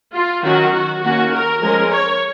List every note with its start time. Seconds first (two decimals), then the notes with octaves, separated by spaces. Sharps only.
0.15 F4
0.44 D#3 F#3 C#4 F#4
0.74 F#4
1.02 D#3 A#3 C#4 F#4
1.32 A#4
1.61 F3 G#3 C#4 A#4
1.91 C#5